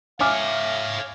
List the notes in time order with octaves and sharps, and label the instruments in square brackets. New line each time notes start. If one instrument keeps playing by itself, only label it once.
[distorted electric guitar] C#5 E5 [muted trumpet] F5 [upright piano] G#5 D6 F6